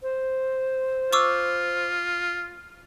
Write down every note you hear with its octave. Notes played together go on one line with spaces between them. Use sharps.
C5
F4 C#6 D6 E6